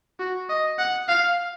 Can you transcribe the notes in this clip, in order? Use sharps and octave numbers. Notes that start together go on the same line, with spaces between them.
F#4
D#5
F#5
F5